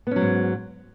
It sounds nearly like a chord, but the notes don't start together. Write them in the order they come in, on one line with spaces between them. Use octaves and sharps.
B3 C#4 F#3 G#2